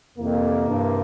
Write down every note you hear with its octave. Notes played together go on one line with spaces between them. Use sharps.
F2 C3 E3 A#3
G2